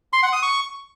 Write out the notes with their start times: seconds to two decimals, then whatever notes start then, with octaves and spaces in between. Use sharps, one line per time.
0.13 C6
0.23 F#5
0.33 D#6
0.42 C#6